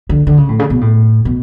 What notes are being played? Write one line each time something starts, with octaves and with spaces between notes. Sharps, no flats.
D3
D3
C#3
A2
C#3
B2
A2
B2